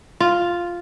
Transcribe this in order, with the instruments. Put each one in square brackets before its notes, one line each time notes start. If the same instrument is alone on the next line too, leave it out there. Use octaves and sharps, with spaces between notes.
[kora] F4